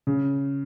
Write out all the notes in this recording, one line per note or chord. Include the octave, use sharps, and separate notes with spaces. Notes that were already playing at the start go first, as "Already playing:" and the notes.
C#3